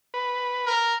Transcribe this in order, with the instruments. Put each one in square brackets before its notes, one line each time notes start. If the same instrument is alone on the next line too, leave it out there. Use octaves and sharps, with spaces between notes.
[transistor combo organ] B4
[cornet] A#4